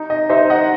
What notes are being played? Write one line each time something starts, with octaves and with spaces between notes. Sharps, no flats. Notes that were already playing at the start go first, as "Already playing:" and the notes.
Already playing: D#4
D#5
D#4 C5 E5
D#5 F#5